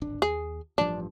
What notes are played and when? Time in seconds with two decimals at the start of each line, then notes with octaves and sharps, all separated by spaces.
0.02 D1 G#1 D4
0.22 D#2 G#4
0.78 A1 G2 F3 D4